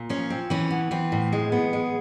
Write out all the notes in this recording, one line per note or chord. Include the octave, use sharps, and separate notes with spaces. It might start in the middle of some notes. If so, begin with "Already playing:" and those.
Already playing: A#2
F3 C#4
C4
E3 C#4
B3
E3 C4
A2
G#3
B3
G#3